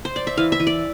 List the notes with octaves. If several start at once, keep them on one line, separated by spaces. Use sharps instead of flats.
C5
D5
E5
E3 F5
E5
E3
D5